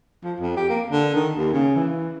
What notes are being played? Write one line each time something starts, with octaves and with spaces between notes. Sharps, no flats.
F3
F2
G4
A#3
D3
D#3
D#2
C#3
E3